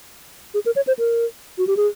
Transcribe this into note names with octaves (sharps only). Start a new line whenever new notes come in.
G#4
A#4
C#5
C5
A#4
F#4
G4
G#4